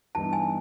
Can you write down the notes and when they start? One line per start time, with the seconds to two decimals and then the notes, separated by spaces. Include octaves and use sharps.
0.15 G2 E3 G3 B3 D#4 A5
0.33 G#5